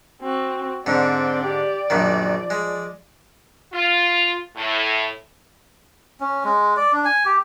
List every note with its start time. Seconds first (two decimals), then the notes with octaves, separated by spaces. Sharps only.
0.23 C4 F#4
0.86 G#2 D3 C4 D5
1.43 G4 D5
1.90 A#1 F#2 D#3 F3
2.50 G#3
3.73 F4
4.56 A2
6.20 C#4
6.44 G#3
6.77 D5
6.93 D4
7.05 G#5
7.26 G4